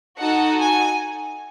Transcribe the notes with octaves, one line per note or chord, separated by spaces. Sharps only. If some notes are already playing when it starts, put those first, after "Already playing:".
D#4 F#4 A4 F#5
G#5